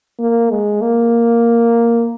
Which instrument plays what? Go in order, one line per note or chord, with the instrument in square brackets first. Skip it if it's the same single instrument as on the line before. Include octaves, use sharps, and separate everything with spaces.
[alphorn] A#3
G#3
A#3